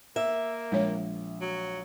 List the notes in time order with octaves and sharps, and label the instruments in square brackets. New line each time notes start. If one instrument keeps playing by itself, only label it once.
[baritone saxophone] A#3 [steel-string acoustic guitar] E5
[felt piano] A#1 [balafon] G#3 C#5
[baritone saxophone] F#3